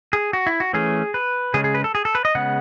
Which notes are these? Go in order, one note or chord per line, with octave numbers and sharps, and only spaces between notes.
G#4
F#4
E4
F#4
E3 A3 C#4 G#4
B4
C#3 G#3 C#4 G#4
G#4
B4
A4
G#4
A4
B4
D#5
C#3 G#3 B3 F#5